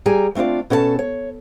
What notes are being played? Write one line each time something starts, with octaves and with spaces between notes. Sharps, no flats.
G3 G#4 G5 G#5 A#5
A3 C4 D4 F4 D5
B2 C#4 A4 D#5 A5
C#5